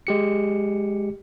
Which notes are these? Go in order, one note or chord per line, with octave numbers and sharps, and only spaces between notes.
G#3 G4 C#7